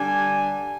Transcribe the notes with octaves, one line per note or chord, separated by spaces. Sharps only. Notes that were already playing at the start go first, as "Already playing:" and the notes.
Already playing: D3 G3 D4 G#5